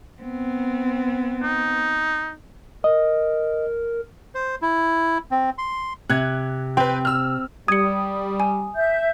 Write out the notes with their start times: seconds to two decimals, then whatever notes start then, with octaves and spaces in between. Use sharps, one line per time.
0.21 B3 C4
1.43 D#4
2.84 A#4 D#5
4.35 C5
4.62 E4
5.31 C4
5.58 C6
6.10 C3 F#6 G#6
6.77 C4 B4 G5
7.05 E6 F6
7.68 G3 D#6 G#6 C#7
8.40 G#5
8.75 E5 G6